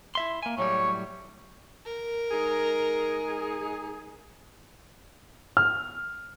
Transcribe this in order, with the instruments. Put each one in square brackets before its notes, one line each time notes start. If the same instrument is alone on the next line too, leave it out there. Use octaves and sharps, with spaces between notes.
[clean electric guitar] E4 E5 C6
A#3 G#5
[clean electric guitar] A2 F#3 G3 [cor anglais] C#5
[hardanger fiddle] A#4
[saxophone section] G#3 D#4 G#4
[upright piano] F6